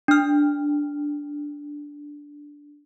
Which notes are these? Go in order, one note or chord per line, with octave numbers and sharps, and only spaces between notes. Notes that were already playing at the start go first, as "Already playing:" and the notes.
D4 F6